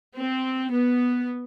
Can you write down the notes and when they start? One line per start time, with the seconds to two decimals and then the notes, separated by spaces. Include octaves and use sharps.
0.15 C4
0.70 B3